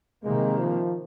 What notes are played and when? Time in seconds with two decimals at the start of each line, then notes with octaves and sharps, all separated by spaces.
0.24 C3 D#3 G#3 A#3
0.59 F3